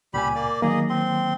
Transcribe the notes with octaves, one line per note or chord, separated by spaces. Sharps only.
C#2 A#2 G3 G4 G#5 B5
A#3 D5
D#3 F#3 A#3 G#4 D#5
C4 C6